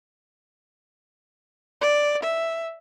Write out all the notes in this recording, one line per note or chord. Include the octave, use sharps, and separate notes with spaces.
D5
E5